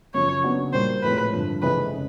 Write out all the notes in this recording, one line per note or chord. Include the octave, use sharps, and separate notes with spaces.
F#2 C#3 F3 C#5
C#3 F#3 B3 D4 F#4
A#2 G3 A#3 C5
A2 F3 G#3 C4 B4
G2 D3 F3
F2 C3 E3 G#3 B4
C#3